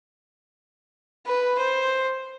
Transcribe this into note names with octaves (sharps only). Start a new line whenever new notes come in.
B4
C5